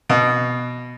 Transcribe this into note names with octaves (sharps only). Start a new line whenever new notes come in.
B2